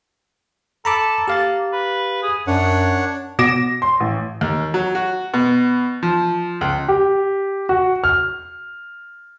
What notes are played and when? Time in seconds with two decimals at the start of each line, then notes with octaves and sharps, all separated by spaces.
0.85 A4 A#5 B5 D6
1.28 A#3 G4 F5 A6
1.73 B4
2.22 G#4
2.47 F#2 D4 C#5 F#5
3.39 B2 D6 A#6 E7
3.82 C6
4.00 A1
4.41 D#2
4.74 F#3
4.95 F#4
5.34 B2
6.03 F3
6.61 C#2
6.88 G4
7.69 F#4
8.04 F6